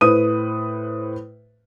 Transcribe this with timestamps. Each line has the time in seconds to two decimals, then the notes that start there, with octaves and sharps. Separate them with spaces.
0.01 A2 B4 C5 D#6 D#7